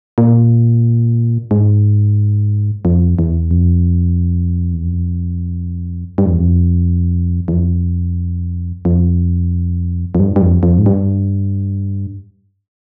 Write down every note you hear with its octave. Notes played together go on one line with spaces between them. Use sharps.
A#2
G#2
F2
E2
F2
E2
F2
G2
F2
E2
F2
E2
F2
F2
F2
G2
G2
F2
F2
G#2
G2